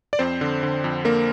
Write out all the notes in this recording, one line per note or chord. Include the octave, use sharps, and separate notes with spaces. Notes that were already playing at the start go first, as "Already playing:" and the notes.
D5
F2 C4 C5
D3
D3
F2
D3 A#3 A#4